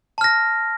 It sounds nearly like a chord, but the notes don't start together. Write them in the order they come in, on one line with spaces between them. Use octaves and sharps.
A5 F6 A#6